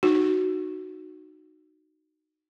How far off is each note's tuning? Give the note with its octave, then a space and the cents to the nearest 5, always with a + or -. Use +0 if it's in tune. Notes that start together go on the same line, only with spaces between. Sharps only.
D#4 -15 F#4 +0